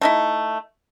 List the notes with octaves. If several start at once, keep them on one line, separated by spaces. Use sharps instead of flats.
A3 D#4 E4